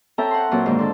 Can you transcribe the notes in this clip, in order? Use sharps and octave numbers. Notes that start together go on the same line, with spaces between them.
C4 C#4 A4 E5 G5 A#5
F#5 C6
A#2 F#3 C4 F4
G#2 D3 D#3 A#3
D4 A4